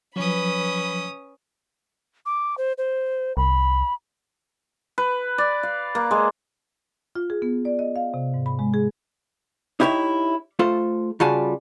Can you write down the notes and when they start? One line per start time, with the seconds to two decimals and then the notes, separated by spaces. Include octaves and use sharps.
0.16 F3 F#3 C#4 B4 B5 D#6
2.26 D6
2.58 C5
2.78 C5
3.37 C2 B5
4.98 B4
5.38 D5
5.63 F5
5.95 A#3
6.11 G#3
7.15 F4
7.30 G#4
7.42 B3
7.65 D5
7.79 D#5
7.96 F5
8.14 C3
8.34 G#2
8.46 B5
8.59 G#3
8.74 G#4
9.80 D#4 E4 G4 A#4 C#5 E5
10.59 A3 F4 A4 C5
11.20 C#3 G3 F4 F#4 G#5 A5